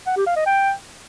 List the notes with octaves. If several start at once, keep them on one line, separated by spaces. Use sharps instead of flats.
F#5
G4
F5
D#5
G5